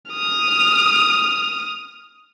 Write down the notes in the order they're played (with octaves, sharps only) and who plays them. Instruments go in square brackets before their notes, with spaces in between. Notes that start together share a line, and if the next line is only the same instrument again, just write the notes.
[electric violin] D#6 F6